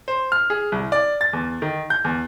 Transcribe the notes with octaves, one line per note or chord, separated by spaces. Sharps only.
C5
F6
G#4
C2
D5
A6
E2
D#3
G6
E2